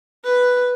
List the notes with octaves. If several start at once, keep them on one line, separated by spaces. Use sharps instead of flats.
B4